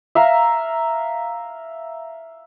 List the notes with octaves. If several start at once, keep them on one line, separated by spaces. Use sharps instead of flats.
E5 F5 A#5